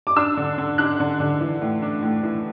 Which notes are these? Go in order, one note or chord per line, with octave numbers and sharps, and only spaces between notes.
D6
D4 E6
D3
D3
D4 F#6
D3
D3
E3
A2
D4
A2
E3